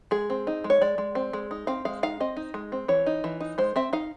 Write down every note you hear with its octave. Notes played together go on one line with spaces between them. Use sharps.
G#3 G#4
C4
D#4
G#3
C#5
G#3 D5
G#3
C4
G#3
D#4
C4 F5
G#3 F5
D#4 F5
C4 D#5
D#4
G#3
C4
E3 C#5
D#4
E3
D#4
G#3 C5
C4 E5
D#4 F5